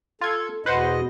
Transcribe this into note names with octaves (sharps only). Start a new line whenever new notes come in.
F4 A4 G#6
E2 B2 B4 C5 D#5 F#5